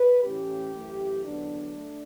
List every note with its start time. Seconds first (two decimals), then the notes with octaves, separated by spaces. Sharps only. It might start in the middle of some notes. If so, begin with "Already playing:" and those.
Already playing: B4
0.23 A2 E3 A3 C#4 G4
0.74 F#2 E3 A3
1.24 E2 D3 F#3 B3 D4
1.75 A3